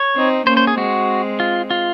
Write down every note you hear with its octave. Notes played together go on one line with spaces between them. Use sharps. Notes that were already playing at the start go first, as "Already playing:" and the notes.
Already playing: C#5
C4 D#4
A#3 C#4 C5
C5
G#4
G#3 C4 F#4
F4
F4